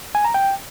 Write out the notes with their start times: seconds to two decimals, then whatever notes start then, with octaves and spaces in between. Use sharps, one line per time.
0.15 G#5
0.25 A#5
0.34 G5